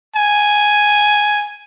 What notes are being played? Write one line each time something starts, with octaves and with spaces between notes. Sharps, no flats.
G#5